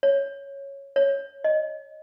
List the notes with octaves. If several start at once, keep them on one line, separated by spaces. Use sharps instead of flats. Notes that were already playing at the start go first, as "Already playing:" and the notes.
C#5
C#5
D#5